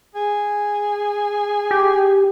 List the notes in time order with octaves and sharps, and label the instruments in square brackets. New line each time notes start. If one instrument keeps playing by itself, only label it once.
[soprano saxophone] G#4
[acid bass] G4